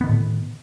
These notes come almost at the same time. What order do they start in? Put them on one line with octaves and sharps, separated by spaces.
B3 D#3 D3 A2